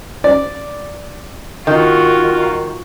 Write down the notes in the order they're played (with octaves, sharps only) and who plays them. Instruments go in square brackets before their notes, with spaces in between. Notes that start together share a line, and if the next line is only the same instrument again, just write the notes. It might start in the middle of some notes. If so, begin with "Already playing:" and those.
[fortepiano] D5
[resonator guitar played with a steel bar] D#3 [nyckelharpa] F4 F#4